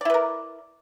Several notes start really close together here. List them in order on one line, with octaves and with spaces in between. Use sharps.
D5 E4 B4 A#4